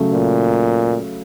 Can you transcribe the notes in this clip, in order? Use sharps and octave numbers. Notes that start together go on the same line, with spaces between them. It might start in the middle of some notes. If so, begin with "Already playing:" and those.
Already playing: C#3 F#3 A3
A#2